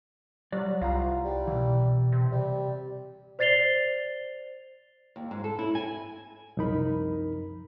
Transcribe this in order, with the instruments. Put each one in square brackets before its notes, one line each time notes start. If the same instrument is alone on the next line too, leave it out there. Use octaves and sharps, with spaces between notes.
[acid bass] F#3 [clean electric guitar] G3 D5
[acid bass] C2 [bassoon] F4 [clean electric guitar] F5 F#5 A#5
[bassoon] G3
[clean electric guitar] B2 E3
[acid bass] C3
[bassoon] G3
[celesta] C5 D5 A6 C7 F7 G7
[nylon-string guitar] D#2
G#2
A4
E4
G#5
[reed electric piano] C2 F#2 F3 D#4 A#4 B5